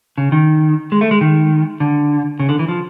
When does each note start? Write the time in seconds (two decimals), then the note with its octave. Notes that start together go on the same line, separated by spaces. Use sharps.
0.18 C#3
0.32 D#3
0.92 G#3
1.01 A3
1.11 G#3
1.21 D#3
1.80 D3
2.40 C#3
2.49 D3
2.59 E3
2.68 F3